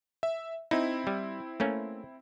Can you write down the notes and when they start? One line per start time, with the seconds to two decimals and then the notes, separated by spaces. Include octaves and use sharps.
0.23 E5
0.71 C4 D#4 E4
1.07 G3
1.60 A3 A#3 C#4